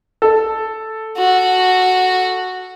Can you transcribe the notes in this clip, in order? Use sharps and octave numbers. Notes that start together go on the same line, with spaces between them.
A4
F#4